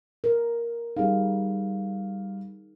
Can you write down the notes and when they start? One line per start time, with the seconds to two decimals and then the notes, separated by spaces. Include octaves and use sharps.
0.24 A#4
0.97 G3 D#4 G#4 F5